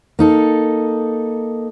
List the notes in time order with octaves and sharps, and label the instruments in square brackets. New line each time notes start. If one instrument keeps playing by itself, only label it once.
[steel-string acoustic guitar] A#3 D#4 A4